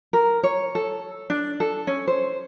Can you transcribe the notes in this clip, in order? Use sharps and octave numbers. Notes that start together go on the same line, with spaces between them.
A#4
C#5
A4
D4
A4
C#4
C5